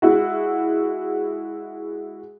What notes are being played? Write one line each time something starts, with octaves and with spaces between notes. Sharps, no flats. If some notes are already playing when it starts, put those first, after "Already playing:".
G#3 E4 F#4